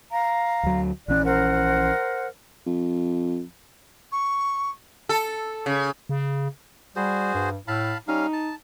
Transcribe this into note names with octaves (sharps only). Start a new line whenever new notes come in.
F5 A#5
D2 F#3
A#1 E3 C#4 D5 F#6
A#4 C5 F#5
F2
C#6
A4
C#3
C#3
G3 F#4 G#4 C5
G2
A2 F5 A5 B5
G3 C#4 D#4 F5
A5